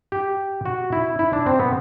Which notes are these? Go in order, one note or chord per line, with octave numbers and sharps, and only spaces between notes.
G4
F#4
E4
E4
D4
C4
B3